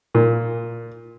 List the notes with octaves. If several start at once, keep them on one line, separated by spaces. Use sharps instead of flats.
A#2